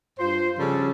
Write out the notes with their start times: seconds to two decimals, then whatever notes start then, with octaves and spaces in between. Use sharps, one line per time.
0.18 G2 F4 C5
0.58 C#3 F3 G3 C#4 A4